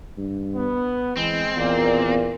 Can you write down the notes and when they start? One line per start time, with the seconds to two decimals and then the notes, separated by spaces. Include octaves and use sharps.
0.18 G2
0.55 B3
1.17 E3 G#3 C4
1.57 E2 A#2 D#3 A#3 D5